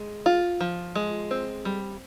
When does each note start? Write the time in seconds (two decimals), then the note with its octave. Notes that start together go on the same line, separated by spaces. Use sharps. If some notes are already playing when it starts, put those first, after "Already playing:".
Already playing: G#3
0.26 F4
0.61 F3
0.95 G#3
1.31 C4
1.65 G3